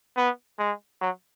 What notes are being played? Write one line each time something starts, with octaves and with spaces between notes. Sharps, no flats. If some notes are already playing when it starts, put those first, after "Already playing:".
B3
G#3
F#3